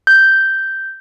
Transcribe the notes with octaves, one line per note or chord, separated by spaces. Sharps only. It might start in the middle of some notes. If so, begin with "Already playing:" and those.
G6